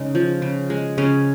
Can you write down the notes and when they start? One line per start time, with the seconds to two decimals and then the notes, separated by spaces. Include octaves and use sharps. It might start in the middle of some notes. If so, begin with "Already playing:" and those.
Already playing: C#3 G#3 D#4
0.15 F3
0.42 C#3
0.70 G#3
0.98 C#3 C#4